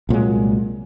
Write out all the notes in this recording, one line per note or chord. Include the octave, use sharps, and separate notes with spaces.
C2 A#2 F#3 G#3